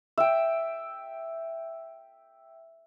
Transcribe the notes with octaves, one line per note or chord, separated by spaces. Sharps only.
E5 G5